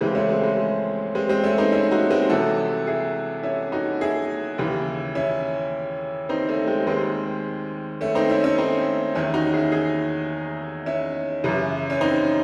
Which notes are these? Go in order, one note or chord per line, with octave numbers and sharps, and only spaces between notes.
C#2 C#3 E3 G#3 C4
A3 C#4
G#3 C4
G#3
G#3 C4
G#3 C4
A3 C#4
C4 D#4
C#4 E4
D#4 F#4
G#3 C4
C2 C3 E3 F#4 A4
E4 G#4
C#4 E4
D#4 F#4
E4 G#4
D#2 C#3 E3
C#4 E4
C4 D#4
A3 C#4
G#3 C4
D#2 D#3 G#3 C4
A3 C#4
C4 D#4
C#4 E4
A3 C#4
C4 D#4
E2 D#3 C#4 E4
D#4 F#4
E4 G#4
E4 G#4
C#4 E4
F#2 C#3 E3
C#4
C4 D#4